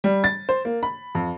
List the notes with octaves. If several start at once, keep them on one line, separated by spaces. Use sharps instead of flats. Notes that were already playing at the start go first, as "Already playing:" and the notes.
G3
A6
C5
A#3
B5
F2